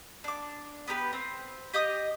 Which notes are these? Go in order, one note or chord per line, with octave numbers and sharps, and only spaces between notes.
D4 D6
B3 G4 A#4 B4
C4
G4 D#5 D6 D#6